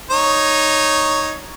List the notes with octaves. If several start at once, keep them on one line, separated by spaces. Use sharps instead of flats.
D#4 C#5